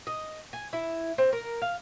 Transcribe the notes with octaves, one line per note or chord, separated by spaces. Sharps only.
D#5
G#5
E4
C4
A#4
F5